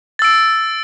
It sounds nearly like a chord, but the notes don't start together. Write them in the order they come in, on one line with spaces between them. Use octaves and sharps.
A6 E6 D7